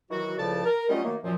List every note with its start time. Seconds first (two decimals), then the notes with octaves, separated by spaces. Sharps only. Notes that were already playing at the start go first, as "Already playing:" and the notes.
0.10 D#3 E3 F#3 F#4
0.37 C#2 A2 C#3 F3 D5 A5
0.65 A#4
0.89 F#3 G3 A3 C#4 F4 D#5
1.03 D#3 F#3 A3 A#3
1.24 F#2 A#2 F3